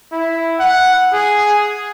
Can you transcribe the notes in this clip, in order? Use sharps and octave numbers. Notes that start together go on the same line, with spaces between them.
E4
F#5
G#4